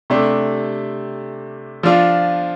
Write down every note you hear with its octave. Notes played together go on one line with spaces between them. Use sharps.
C3 A3 D4
F3 D4 F4